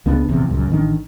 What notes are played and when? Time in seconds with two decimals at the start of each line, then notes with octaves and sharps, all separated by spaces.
0.06 C#2 A#3 B3 D4
0.27 F1 A#1 E2 C3
0.50 C#2 F#2 A#2
0.70 A1 D#3 A3 D4